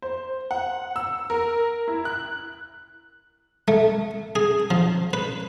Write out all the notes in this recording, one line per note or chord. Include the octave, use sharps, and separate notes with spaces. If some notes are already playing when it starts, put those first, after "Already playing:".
C5
F#5
E6
A#4
E4
F#6
A3
G#4
F3
B4